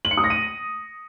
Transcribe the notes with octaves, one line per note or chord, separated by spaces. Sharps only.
F#7
C#7
D#6
A#6
D#7